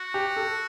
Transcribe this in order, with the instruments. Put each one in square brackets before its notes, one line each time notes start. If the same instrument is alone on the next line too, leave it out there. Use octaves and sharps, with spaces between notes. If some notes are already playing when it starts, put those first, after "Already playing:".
Already playing: [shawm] F#4
[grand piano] G4
A4